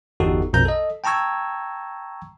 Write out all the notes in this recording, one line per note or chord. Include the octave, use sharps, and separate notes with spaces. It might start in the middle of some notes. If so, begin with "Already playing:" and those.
G1 E2 D#4 F#4 G4 A4
A#1 F2 B2 A#5 G6
A4 D#5
G5 A5 A#5 C#6 E6 G#6